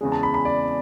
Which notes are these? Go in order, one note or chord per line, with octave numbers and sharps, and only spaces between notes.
E2 C#3 G#3
A5
B5
B5
D5